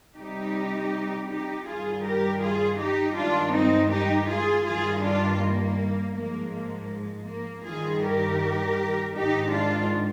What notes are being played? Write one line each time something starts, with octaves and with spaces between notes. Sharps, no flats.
C3 G3 D#4 G4
D#4 G4
G2 D#3 G3 F4 G#4
G4 A#4
F4 G#4
D#4 G4
G2 D#3 G#3 D4 F4
C4 D#4
D#4 G4
F4 G#4
G2 D#3 G3 F4 G#4
D4 F4
A#3
G#2 F3 G#3 A#3
A#3
G#3
A#3
G2 D#3 G3 F4 G#4
G4 A#4
G#2 D#3 G#3 D#4 G4
D4 F4